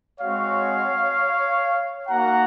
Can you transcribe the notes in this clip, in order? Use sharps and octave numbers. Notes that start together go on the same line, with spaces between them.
G#3 C4 F#4 C#5 F5
A#3 D#4 F#4 F#5 A#5